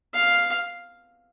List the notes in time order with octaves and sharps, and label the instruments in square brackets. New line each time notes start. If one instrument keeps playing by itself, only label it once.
[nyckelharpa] F5